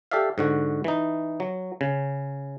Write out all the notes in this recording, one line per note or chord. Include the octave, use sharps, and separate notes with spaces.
G4 A4 D5 E5 F5
G#2 D3 F#4
E3 D#4
F#3
C#3